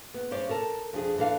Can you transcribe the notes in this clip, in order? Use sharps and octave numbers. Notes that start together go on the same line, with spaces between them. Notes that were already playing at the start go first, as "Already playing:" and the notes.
B3
G2 C#4 C5 D5
A4 A#4 A5
F2 D4 G#4
E3 D4 A4 F5